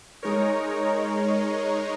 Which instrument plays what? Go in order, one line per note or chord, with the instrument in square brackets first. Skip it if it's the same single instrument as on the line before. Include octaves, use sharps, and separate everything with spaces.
[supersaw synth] G#3 D#4 A#4 C#5